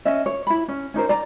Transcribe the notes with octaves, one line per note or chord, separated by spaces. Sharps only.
C#4 D#5 E5
C#5
E4 B5
C#4
C#4 D#4 A#4 C5
D5 A#5